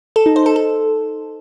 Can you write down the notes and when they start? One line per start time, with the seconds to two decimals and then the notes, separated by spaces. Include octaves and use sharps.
0.16 A4
0.26 D#4
0.36 C5
0.46 A4
0.56 A4